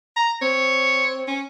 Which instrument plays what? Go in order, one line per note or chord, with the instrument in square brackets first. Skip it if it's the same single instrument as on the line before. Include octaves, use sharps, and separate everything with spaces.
[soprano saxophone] A#5
[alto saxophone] C4 [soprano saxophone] C#5
[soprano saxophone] C#4